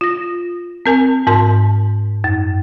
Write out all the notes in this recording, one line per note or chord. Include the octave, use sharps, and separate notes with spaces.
F4 A#6
C4 A#4 G#5
G#2 A#4 A5 C6
F#2